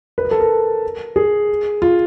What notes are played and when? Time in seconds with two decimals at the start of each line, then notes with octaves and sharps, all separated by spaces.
0.18 B4
0.25 A#4
0.31 A4
0.40 A#4
1.16 G#4
1.82 F4